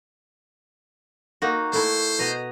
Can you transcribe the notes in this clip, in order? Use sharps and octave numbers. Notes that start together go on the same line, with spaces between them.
A#3 D#4 F#4
A3 E4 C5
B2 D#5 A#5